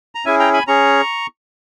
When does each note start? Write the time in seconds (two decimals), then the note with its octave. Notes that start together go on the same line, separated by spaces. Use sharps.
0.15 A#5
0.25 C#4 E4 G#4 E5 G#5
0.39 G5 A#5
0.53 G#5 B5
0.67 C#4 G#4 A#5 C#6